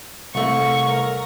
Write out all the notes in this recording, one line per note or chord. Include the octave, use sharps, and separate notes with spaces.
C2 A3 A#3 C#6
A#4